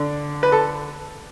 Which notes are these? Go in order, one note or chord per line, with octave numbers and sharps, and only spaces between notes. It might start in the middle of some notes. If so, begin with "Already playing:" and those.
Already playing: D3 D4
B4
A4